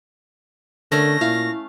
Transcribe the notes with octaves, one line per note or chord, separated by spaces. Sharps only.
D3 A3 C#4 A#4 A#6
A#2 E4 F5